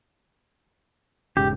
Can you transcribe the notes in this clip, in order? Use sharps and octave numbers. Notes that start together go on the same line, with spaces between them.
E1 G#2 C#3 G4